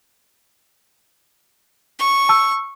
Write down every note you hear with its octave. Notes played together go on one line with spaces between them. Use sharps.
C#6
A5 E6